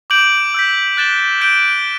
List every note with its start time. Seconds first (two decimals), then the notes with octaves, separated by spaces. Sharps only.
0.10 D6 G6 D7 F#7
0.54 E6 G6 B6
0.97 F#6 A6 E7 G7
1.41 G6 D7 G7